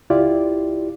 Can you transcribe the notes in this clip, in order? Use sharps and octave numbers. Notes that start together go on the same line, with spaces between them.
C#2 E4 F4 G4 D5